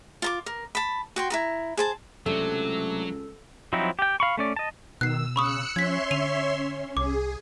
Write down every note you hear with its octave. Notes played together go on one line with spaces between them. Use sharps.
F4 A#5 D6
A#4
A5 B5
F#4 G5 C6
E4 F#4 A#5
G#4 C5 A5
C#2 C3 F#3 A3 D4 A4
F3 F#3 C4 D#4 E4
G4 G5
F5 B5 C#6
A3 C#4 D5
D#5 A5
B2 D#3 E6 F#6 C7
C#3 B5 C#6 D#6 E6 F#6 C#7
F3 C#4 C#5 E5 C6 G#6 B6
D3 D#7 F7
C2 G#4 D6